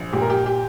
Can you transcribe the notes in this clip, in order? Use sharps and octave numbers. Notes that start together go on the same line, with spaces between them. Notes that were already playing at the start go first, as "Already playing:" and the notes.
Already playing: A#1
A#2 G4
A#4
G4
G4